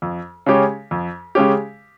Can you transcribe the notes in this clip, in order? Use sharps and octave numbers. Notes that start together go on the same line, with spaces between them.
F2
C#3 G#3 C#4 G4
F2
C#3 G#3 C#4 G4